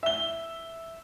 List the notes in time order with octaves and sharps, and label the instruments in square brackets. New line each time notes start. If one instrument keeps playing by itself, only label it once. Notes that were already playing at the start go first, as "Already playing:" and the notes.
[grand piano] E5 G7